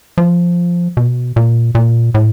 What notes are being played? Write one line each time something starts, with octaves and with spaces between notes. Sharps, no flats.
F3
B2
A#2
A#2
A2